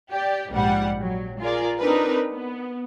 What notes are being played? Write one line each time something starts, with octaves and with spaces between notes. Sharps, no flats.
G4 D5
A#1 G#2 G3 F#5
F#3
F4 G#4 A#4 D5
C4 D4 D#4 A#4 B4
B3